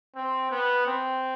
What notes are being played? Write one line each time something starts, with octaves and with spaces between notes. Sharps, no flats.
C4
B3
C4